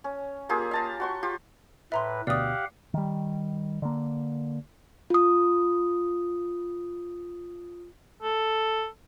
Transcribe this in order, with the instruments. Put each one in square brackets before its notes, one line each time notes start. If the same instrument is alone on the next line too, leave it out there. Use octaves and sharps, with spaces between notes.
[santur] C#4
A#3 F4 G4 G#4
F5 A5 A#5
F#4 C6 C#6
F4 G4
[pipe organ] A2 B4 [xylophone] E5 A#5 C6
[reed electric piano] D2 B2 [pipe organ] G4 F5 F#5 [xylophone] D5 D#6
[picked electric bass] D#3 G3
D3 A#3
[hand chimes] F4 D#6
[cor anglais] A4